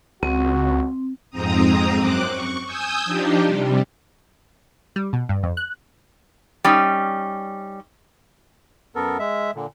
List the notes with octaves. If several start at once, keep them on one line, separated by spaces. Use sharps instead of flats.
C#2 C4 F#4
F2 G#2 C4 A#5 D#6
F#2 C4 D6 F#6
C#6
G#5 D#6 E6 G6
F3 D4 D#4 G4
C3 G3
G3
B2
G2
F2
F#6
G3 C#4 D#4
F#2 B3 A4 A#4
G#3 E5
A#2 D3